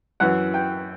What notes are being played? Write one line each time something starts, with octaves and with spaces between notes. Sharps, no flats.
F#2 E3 F#5
G5